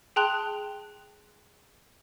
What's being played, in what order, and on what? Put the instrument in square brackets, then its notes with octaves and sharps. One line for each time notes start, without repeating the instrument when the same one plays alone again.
[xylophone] G#4 G5 A5 C6 F#6 F7